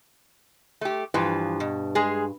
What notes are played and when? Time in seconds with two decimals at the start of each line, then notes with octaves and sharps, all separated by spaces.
0.81 A3 G4
1.14 G2 E3 F3
1.60 B2
1.95 G#3 G#4